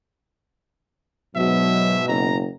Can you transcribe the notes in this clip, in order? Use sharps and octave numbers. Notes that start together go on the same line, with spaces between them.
G#2 B2 F#3 E5
F#1 A#5